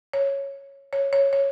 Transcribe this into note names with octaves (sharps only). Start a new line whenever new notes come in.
C#5
C#5
C#5
C#5